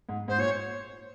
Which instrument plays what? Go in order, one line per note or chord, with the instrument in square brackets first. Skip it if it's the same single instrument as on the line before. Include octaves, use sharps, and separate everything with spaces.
[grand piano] G#2
[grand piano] G#2 [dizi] C5
[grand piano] A#2 [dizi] C#5